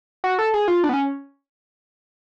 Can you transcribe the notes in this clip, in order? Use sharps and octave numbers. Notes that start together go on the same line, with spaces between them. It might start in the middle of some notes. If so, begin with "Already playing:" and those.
F#4
A4
G#4
F4
D4
B3
C#4